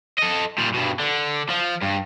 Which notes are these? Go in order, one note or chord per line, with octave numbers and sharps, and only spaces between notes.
A4 D#5
A#2 G3
G2 B2
D3
F3
G2